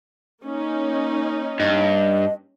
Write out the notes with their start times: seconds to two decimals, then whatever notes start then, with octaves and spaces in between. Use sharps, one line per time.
0.43 A#3 C#4 D#4
1.60 G2 D#5